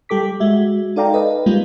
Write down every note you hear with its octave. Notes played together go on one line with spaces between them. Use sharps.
G3 G4 A4 D6 B6
G#3 F#4 E5
D#4 A4 D5 F5 G5 A#5
A4 B4 D#5
G3 G#3 A#3 B3 D#4 F4